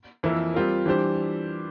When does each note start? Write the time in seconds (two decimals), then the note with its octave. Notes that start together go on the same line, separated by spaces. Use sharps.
0.23 F2 E3 A#3 E4 A#4
0.54 G3 C4 F4 A#4
0.86 E3 G3 D4 G4 C5